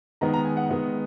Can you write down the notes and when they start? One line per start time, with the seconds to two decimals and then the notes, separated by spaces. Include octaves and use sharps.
0.21 D#3 G#3 B3 D#4 A#5
0.34 A#5
0.45 G#5
0.57 F#5
0.69 D#3 G#3 B3 D#4